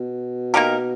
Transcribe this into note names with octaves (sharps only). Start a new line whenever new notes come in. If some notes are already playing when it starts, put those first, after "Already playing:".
Already playing: B2
A#3 D#4 G4 A#4